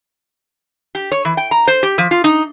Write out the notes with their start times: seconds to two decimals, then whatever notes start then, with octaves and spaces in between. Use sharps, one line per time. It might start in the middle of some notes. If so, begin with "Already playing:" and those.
0.95 G4
1.12 C#5
1.25 E3
1.37 G5
1.51 A#5
1.67 C5
1.83 G4
1.98 F3
2.11 F4
2.24 D#4